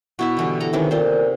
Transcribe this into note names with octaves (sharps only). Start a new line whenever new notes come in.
B2 E4 F#4 E5
D3 E3 G3
A4 A#5
C3 D#3 E3 C#4
A#2 D#4 F4 C5